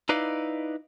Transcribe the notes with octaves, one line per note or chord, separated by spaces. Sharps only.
D#4 E4 B4 D5 D#5 F5